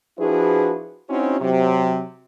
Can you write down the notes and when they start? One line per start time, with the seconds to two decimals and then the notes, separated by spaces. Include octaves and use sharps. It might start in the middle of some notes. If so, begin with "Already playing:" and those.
0.19 F3 D4 E4 F#4 G#4 B4
1.09 C4 C#4 D#4 E4 F#4
1.40 C3 F#3